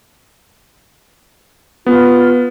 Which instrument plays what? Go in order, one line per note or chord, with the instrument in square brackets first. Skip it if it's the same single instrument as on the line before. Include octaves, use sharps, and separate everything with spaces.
[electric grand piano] B3 [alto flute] F4